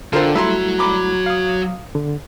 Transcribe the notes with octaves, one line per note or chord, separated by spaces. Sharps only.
D3 F4 A4 A#4 C5 G5
F#3 G3 A3 E4 F#4 E5 A#5 C6
A#5 B5 D6
F5 D#6
D3